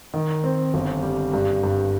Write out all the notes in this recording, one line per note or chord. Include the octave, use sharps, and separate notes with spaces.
D#3
C4
G1
G3
G2
G2